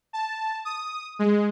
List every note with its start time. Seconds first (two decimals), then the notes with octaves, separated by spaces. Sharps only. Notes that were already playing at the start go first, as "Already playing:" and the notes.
0.13 A5
0.65 D#6
1.19 G#3